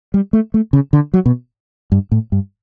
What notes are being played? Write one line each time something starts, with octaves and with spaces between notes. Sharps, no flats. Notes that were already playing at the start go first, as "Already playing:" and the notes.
G3
A3
A3
C#3
D3
F#3
B2
G2
A2
G2